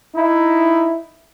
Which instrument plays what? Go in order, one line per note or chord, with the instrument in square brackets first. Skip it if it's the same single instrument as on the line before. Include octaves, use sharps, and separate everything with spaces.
[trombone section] D#4 E4